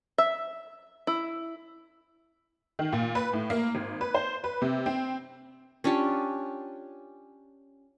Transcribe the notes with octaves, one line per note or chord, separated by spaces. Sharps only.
E5
E4
D#3
A#2
B4
A2
A#3
G#1
B4
C5
B4
C3
C4
C#4 D4 F4 G4